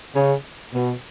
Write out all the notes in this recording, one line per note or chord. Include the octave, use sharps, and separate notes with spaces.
C#3
B2